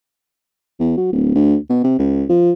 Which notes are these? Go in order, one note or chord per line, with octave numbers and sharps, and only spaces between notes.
E2
F#3
D1
D2
B2
C3
C#2
F3